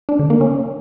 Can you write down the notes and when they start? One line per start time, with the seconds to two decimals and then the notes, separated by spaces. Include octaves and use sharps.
0.09 D4
0.19 D3
0.30 A#3
0.41 C#4